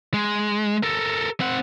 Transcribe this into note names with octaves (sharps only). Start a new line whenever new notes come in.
G#3
A4 A#4
C4 F#5